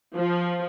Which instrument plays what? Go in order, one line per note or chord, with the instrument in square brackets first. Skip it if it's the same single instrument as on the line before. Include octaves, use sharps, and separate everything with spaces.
[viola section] F3